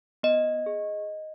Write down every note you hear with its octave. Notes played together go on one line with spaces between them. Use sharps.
B3 D#5
G#4